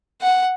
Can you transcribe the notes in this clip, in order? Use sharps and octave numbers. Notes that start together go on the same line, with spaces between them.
F#5